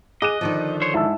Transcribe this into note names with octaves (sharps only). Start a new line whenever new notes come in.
G#4 D#5 D6 F#6 D#7
D3 D#3 F3
C5 C#5
G#2 E4 A5 E6